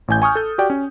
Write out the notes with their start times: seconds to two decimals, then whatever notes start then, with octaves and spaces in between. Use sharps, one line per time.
0.08 A1 A2 G#5 G6
0.22 G#5 C#6 D#6 F6
0.35 A4 G6
0.58 F#4 G4 D5 G5
0.70 C#4